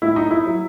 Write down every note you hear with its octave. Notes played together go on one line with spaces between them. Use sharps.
A2 E4
D#4
E4
F#3